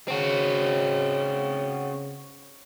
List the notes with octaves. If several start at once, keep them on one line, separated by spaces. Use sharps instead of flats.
C#3 C4 F#4